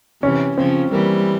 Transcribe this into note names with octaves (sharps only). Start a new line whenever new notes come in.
C3 E3 C#4
C#3 F3 C4
E3 G3 A#3